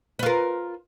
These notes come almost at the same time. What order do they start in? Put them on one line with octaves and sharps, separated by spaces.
B4 F4 A#4